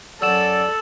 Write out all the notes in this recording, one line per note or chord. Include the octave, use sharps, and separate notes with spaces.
F#2 F#3 A4 D5 E6 E7